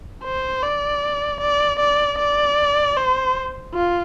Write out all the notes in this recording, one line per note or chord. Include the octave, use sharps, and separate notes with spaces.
C5
D5
D5
D5
D5
C5
F4